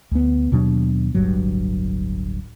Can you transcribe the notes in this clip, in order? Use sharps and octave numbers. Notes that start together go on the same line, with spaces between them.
D2 B3
D#2 B2 F#3 D4
D1 G1 G2 F#3